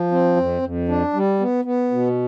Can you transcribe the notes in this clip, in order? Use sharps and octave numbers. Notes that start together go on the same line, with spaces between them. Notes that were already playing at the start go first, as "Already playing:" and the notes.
Already playing: F3
C4
F2
F2
D4
G3
B3
B3
B2